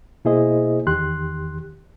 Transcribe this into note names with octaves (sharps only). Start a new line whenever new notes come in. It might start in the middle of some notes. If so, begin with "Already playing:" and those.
B2 A#3 E4 G#4 C5 D#5
E2 D#3 G4 C6 F#6